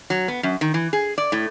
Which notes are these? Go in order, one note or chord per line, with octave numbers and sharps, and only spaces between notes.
F#3
B3
F#2
D#3
E3
G#4
D5
A2